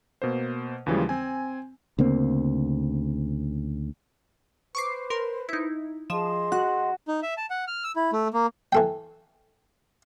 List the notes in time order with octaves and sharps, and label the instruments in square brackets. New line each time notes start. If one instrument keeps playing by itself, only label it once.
[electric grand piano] B2 A#3 C5
D#2 C#3 E3 F3 G3 G#3
C4 G#5
[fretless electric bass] D2 C#3 A#3 C4
[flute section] B4 C5 [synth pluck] C#6 D6 C7
[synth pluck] A#4 C6
D#4 E4
[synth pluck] F3 E7 [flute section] G#4 D#5 C6
[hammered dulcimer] F#4 [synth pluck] F#6
[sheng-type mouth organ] D#4
E5
A5
F#5
F6
E6
E4
A3
A#3
[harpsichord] E3 A4 G5